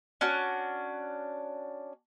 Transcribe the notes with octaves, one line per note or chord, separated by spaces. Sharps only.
C#4 D4 F#4 F#6